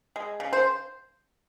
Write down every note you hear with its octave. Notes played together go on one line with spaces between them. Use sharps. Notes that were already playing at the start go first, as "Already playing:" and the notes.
G#3
C#3
C5